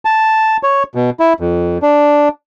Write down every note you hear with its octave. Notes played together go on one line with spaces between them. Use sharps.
A5
C#5
B2
E4
F2
D4